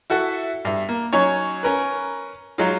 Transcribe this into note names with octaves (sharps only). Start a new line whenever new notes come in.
E4 F#4 A4 E5 F#5
G2 E5
A#3
F#3 C#4 D#4 C#5
C#4 A#4 B4
F#3 G#3 D#4 F4